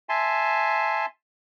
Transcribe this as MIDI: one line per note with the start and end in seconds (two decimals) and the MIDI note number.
0.09 1.06 76
0.09 1.06 80
0.09 1.06 81
0.09 1.06 84